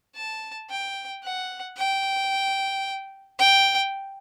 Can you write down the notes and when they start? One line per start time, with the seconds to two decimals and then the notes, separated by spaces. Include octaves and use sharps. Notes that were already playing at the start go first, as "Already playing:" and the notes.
0.15 A5
0.70 G5
1.24 F#5
1.77 G5
3.39 G5